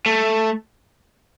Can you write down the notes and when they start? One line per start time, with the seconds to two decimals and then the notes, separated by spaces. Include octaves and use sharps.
0.06 A3